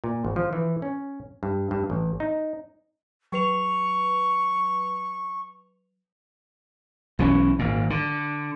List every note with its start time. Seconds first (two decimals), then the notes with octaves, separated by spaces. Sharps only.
0.04 A#2
0.25 G#1
0.36 F3
0.53 E3
0.82 C#4
1.43 G2
1.71 G2
1.90 A1
2.20 D#4
3.32 F#3 B4 C#6 F7
7.19 B1 E3 F#3 C#4
7.59 G#1 A#2
7.90 D3